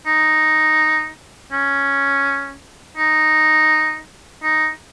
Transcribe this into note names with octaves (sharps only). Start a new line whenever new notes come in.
D#4
C#4
D#4
D#4